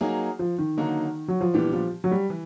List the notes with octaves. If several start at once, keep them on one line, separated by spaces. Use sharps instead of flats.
F#3 A#3 D#4 G#4
F3
D#3
D3 F#3 A#3 D#4
F#3
F3
A#2 E3 G3 B3 D4 G4
F3
F#3
G3
E3